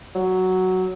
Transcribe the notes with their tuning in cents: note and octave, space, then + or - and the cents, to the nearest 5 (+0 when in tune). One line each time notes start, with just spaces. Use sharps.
F#3 +5